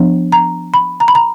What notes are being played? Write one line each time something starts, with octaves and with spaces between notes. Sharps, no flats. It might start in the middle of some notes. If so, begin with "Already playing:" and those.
Already playing: F3 B3 D4
A#5
B5
A#5
B5
A#5